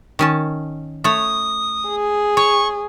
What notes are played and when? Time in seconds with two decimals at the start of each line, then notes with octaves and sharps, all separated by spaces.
0.19 D#3 C#4 A5
1.04 A3 C#5 D#6
1.87 G#4
2.37 C#5 C#6